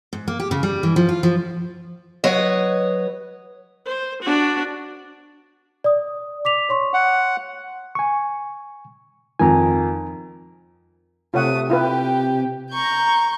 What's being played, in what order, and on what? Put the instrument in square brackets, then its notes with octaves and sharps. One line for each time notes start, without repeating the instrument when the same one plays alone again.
[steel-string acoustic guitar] G#2
A#3
G4
C#3
G3
E3
F3
F4
F3
F#3 B4 C#5 D#5
[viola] C5
D4 F#4
[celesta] D5 D#6
D6 B6 F7
C#5 C6 C#6
[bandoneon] F#5
[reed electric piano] G#5 C#6
[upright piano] F2 D#3 [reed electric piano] G#5 A#5
[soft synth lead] C3 [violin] A3 D#6 [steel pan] F4 C#5 F#5
[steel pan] E4 F4 B4 [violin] G4 G5
[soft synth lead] A#5 [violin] C#6 G6